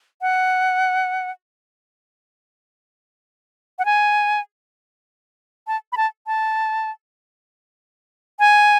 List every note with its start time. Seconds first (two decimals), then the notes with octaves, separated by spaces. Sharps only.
0.22 F#5
3.79 F#5
3.85 G#5
5.67 A5
5.92 B5
5.97 A5
6.27 A5
8.40 G#5